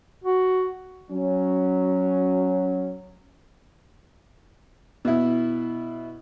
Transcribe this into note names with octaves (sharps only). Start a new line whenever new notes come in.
F#4
F#3 C#4
B2 E4